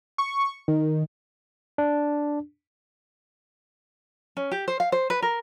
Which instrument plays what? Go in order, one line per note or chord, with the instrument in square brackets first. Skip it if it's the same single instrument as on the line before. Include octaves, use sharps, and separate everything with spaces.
[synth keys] C#6
D#3
[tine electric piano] D4
[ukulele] C#4
G4
C5
F5
C5
B4
A#4